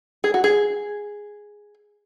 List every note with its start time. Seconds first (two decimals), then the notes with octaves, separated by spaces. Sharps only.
0.24 G#4
0.34 F#4
0.44 G#4